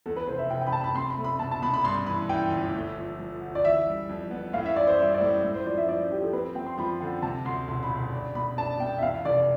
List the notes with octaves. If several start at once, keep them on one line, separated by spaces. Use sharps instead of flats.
E2 A4
B4
F1 C5
E5
F1 G5
G5
B5
F1 A5
B5
C4 C6
B5
A3
B5
B2 A5
A5
B2 B5
B5
G2 C6
E3 B5
E3 G5
G1
A3
F3
F3
D2
D5
E3 E5
G3
F2
B3
A2 F5
E5
A1 D5
C5
G3 E5
D5
A2
A2
C5
F3 D5
E5
F3 D5
F3 G4
A4
C4 B4
C4 G5
C6
F3 B5
D3 G5
C3 A5
D2 C6
E1 C6
B5
E1
B5
D4
B2 B5
D4 A5
B2 G5
E5
E2 F5
F1 D5